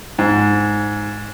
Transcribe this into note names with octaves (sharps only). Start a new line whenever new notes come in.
G#2